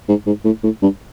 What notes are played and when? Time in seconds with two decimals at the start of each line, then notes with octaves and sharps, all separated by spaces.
0.08 G#2
0.26 G#2
0.45 A2
0.63 A2
0.82 G2